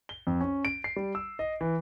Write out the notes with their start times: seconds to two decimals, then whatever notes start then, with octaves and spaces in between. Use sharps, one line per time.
0.09 G7
0.27 F2
0.41 C#4
0.65 D7
0.84 C7
0.96 G3
1.15 E6
1.39 D#5
1.61 E3